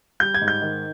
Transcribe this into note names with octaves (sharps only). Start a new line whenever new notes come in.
G3 G6
G#6
G#2
G6
D#3